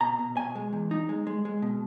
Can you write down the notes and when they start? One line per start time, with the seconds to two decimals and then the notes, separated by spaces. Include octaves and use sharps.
0.01 B2 A#5
0.19 B2
0.37 B2 G#5
0.55 G#3
0.73 E2
0.91 D#4
1.09 G#3
1.27 G#3
1.45 G#3
1.62 B2